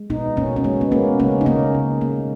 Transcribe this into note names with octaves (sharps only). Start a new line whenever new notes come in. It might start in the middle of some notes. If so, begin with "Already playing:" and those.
Already playing: G#3
B2 B3 D#4
B2 A#3 C#4
C#4
G#3 B3
B3
G#3 A#3 C#4
C#3 A#3 C#4
D#4
C#3 A#3 C#4
C#3
G#3 A#3